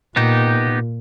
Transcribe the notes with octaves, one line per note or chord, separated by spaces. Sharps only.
A#2 B3 D#4 G4